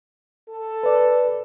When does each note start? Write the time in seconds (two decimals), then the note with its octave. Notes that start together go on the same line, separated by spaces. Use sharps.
0.49 A4
0.83 B4 D5